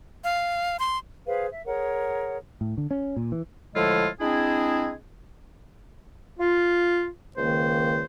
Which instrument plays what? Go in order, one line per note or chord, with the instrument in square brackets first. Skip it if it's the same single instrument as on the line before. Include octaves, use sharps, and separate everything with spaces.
[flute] F5
C6
[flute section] G#4 B4 C5 F5
E5
G#4 A#4 C#5 F#5
[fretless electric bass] A2
D3
C#4
A#2
E3
[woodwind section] A2 D3 F3 G#3 E4 F4
G#3 C4 D4 E4 G#4
F4
C#2 D#3 A#3 C5